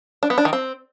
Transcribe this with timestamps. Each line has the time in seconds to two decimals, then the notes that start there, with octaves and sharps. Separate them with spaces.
0.23 D4
0.30 B3
0.38 D4
0.45 D#3
0.53 C4